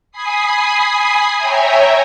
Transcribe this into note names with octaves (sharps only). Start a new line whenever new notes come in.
G#5 B5 D#6 C7
C#5 E5 G5 G#5 A#5